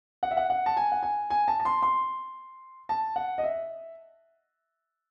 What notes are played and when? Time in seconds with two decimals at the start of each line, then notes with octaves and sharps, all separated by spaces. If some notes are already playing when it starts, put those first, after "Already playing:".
0.23 F#5
0.31 E5
0.37 F#5
0.50 F#5
0.66 A5
0.77 G#5
0.92 F#5
1.03 G#5
1.30 G#5
1.48 A5
1.60 A5
1.65 C6
1.82 C6
2.89 A5
3.16 F#5
3.38 D#5
3.43 E5